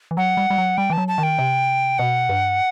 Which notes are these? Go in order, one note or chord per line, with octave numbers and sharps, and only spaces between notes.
E3
F#3 F#5
G3
G3
F#3
G3 G5
E3
F#3 A5
A5
D#3
G5
C3
B2 F#5
G2